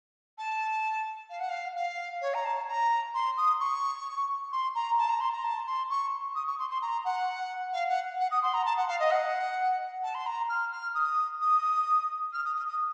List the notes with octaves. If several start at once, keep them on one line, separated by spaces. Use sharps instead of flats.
A5
F5
F#5
F5
F5
C#5
A#5
A5
A#5
C6
D#6
C#6
C6
A#5
A5
A#5
C6
A#5
A5
C6
C#6
D#6
C#6
C6
C6
A#5
F#5
F5
F#5
F#5
D#6
C6
A#5
A5
F#5
F5
D#5
F#5
A5
C6
A#5
F6
F6
D#6
D#6
F6
D#6
D#6
D#6